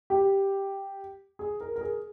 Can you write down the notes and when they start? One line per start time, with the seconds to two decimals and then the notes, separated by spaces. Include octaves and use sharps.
0.10 G4
1.39 G#4
1.61 A#4
1.76 A#4
1.81 G#4